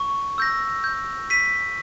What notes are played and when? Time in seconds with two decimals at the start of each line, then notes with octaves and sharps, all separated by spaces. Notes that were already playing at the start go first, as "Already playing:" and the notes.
Already playing: C#6
0.38 E6 G6 A#6
0.84 G6
1.30 B6 D#7